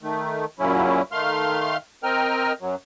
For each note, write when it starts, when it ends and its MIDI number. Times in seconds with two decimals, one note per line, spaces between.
0.03 0.45 51
0.03 0.45 57
0.59 1.02 42
0.59 1.02 46
0.59 1.02 49
0.59 1.02 54
0.59 1.02 61
0.59 1.02 64
1.12 1.77 51
1.12 1.77 57
1.12 1.77 77
1.12 1.77 84
1.12 1.77 89
2.04 2.53 60
2.04 2.53 70
2.04 2.53 75
2.04 2.53 79
2.04 2.53 89
2.61 2.75 42
2.61 2.75 54